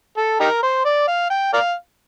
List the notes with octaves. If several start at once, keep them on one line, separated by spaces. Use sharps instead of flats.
A4
D#4 G4 A#4
C5
D5
F5
G5
A#4 D5 F5